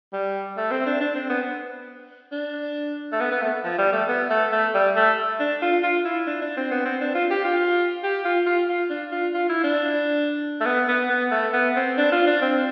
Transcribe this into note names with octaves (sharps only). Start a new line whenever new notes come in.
G3
A3
C4
D4
D4
C4
B3
D4
A3
B3
B3
A3
F3
G3
A3
B3
A3
A3
G3
A3
D4
F4
F4
E4
D4
D4
C4
B3
C4
D4
F4
G4
F4
G4
F4
F4
F4
D4
F4
F4
E4
D4
A3
B3
B3
B3
A3
B3
C4
D4
F4
D4
C4